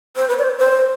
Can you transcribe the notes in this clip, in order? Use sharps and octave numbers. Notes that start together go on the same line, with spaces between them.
C5
B4
D5
C5
C5